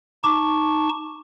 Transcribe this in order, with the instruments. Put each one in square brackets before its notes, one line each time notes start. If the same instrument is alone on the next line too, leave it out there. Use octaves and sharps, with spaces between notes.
[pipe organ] D#4 A5 C#6 [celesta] D6